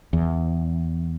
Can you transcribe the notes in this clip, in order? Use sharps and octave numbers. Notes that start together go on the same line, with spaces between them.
E2